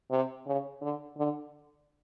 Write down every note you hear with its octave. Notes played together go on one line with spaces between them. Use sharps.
C3
C#3
D3
D3